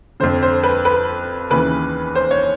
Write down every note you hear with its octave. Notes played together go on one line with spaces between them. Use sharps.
F2 D3 C5
C5
B4
B4
D#2 C#3 E3 B4
C5
C#5